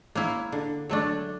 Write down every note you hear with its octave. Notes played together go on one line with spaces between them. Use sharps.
A#3 C#4 E4
D3
F#3 A3 D4